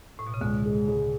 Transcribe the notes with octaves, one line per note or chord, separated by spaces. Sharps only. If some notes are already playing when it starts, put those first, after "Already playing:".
A2
B2
C#3
C#2 B2 D3
G#3
G#3